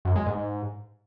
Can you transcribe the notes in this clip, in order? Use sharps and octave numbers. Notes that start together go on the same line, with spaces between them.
F#2
G#3
G#2